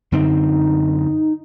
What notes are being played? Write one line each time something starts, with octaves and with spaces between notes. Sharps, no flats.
F#2 D3 C4 D#4